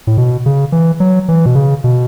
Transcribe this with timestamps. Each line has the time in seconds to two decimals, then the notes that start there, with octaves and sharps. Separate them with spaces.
0.07 A2
0.18 B2
0.46 C#3
0.72 E3
1.00 F#3
1.28 E3
1.46 B2
1.55 C#3
1.84 B2